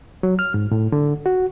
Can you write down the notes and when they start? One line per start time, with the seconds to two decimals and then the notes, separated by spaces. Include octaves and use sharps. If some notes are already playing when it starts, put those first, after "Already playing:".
0.23 F#3
0.39 F6
0.54 G#2
0.71 A2
0.92 D3
1.26 F#4